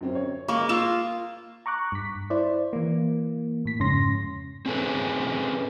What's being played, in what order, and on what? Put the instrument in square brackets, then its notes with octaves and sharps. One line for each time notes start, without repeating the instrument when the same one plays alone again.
[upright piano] F#2 C4 C#4
C#5
[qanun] G#3 A#3 [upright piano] C#6
[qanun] A#3 F4 [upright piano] D#6 E6 E7
[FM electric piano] A#5 C#6 D6 F#6
G2 B6
E4 C5 D5
E3 A#3
A2 B6
F2 G#2 C#3 C#4 C6 A#6
[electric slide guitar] C4 C#4 G#4 A4 B4